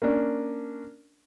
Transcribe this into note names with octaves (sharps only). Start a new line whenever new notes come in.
A#3 C#4 D4